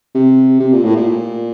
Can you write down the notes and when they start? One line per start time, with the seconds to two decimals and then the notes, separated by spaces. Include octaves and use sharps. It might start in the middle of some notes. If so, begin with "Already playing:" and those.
0.15 C3
0.60 C3
0.73 A#2
0.84 A2
0.97 A#2